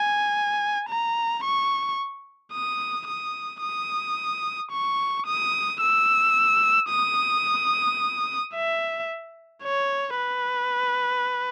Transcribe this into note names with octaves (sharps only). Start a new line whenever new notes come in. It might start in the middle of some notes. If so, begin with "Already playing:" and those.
Already playing: G#5
A#5
C#6
D#6
D#6
D#6
C#6
D#6
E6
D#6
E5
C#5
B4